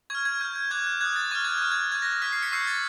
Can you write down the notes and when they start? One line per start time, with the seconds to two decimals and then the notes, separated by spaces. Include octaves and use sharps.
0.10 C#6 F6 G#6
0.25 G#6
0.40 C#6 F6 G6
0.56 G6
0.71 D6 F#6 G#6
0.87 G6
1.01 D#6 F#6 G#6
1.16 A6
1.31 C#6 F6 A6
1.45 G#6
1.58 C#6 F6 G6
1.72 G#6
1.91 C#6 F#6 G#6
2.02 A#6
2.13 A#6
2.22 C#6 F6 B6
2.32 C7
2.42 B6 C#7
2.52 C#6 E6 G6 C7
2.67 A6